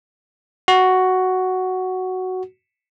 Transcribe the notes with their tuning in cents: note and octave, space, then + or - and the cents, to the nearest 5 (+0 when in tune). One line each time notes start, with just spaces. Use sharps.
F#4 +5